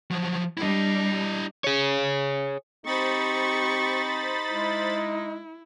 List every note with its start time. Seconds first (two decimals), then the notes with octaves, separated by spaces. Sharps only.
0.11 F3 F#3
0.58 G3 D4 E4 D#5
1.64 G#4 C#5
2.86 C4 D#4 G4 C5 B5 C#6 A6
4.53 G#3 E4